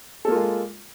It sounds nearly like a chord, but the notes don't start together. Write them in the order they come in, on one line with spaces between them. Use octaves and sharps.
A4 A#3 F4 G#3